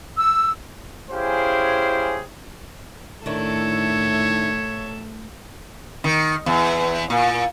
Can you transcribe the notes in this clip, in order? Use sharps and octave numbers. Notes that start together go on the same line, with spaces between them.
E6
C#4 E4 G4 G#4 C5 F5
A2 D#3 D4 E4 A4 C#5 E5
D#3
E2
A#2